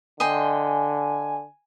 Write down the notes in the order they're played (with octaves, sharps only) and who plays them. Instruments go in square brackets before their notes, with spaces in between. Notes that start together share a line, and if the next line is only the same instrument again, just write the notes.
[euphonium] D3 [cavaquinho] D#5 G5 C6 [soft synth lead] G#5